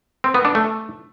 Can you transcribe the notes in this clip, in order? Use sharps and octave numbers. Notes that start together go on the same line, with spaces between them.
C4
B3
D4
A3